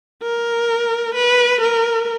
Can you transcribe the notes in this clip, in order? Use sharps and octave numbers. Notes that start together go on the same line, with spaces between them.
A#4
B4
A#4